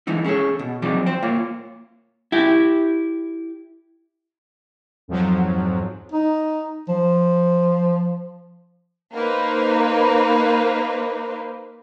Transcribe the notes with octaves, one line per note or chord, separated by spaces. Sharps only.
E3 G#3 D#4 E4
C#4 G#4 A4 C#5
B2
F3 F#3 C4 D#4 G#4 D5
C5 G5
A#3 F4 C#5
E4 G4
F2 G#2 F3 F#3
D#4
F3
A#3 D#4 B4 C5